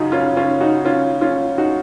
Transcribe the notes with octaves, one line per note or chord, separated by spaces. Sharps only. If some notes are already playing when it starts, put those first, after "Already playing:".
Already playing: F#2 C#3 D#4 F4 F#4
C#4 F4
C#4 F4
D#4 F#4
C#4 F4
C#4 F4
D#4 F#4